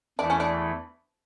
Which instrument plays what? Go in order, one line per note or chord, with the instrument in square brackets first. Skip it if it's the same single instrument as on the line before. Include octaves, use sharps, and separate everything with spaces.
[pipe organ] E2 E3 A3 E4 [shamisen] D4
[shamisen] C#4
D4